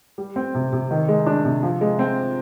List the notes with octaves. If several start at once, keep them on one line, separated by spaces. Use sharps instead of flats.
G3
C4
C3
C3
D#3
G#3
D4
C3
F3
G#3
C4